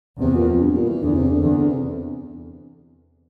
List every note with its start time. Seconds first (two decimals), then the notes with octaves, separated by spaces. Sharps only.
0.20 E2 C3
0.35 A#2
0.48 F2
0.62 G2
0.75 A#2
0.88 E3
1.03 E2 D3
1.15 C3
1.30 D3
1.43 E2 D3
1.57 D3
1.70 C3